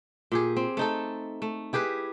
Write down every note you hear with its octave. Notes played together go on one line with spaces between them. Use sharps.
A#2 G4 G#4
C4
A3 D#4 A4
A3
E4 G4 G#4 B4